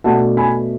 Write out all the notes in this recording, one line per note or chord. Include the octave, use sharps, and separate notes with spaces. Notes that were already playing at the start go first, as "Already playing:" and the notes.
B2 A3 D4 F#5 A5
G#5 B5